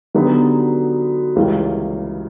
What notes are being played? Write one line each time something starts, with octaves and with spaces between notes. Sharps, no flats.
D3 F#3 B3 D#4 G4
C#2 C#3 E3 G3 A#3